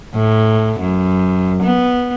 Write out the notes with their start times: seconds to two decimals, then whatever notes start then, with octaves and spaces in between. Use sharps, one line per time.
0.15 A2
0.80 F#2
1.63 B3